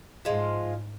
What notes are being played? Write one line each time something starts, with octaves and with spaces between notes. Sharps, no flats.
G#2 F3 G#3 F4